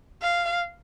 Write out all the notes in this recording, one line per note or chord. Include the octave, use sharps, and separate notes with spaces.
F5